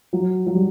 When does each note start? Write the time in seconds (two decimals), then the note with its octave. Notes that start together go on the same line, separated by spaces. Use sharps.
0.13 F#3
0.47 F#3
0.55 G3